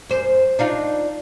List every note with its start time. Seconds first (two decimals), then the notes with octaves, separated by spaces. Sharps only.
0.09 F#2 C5
0.59 D4 D#4 F4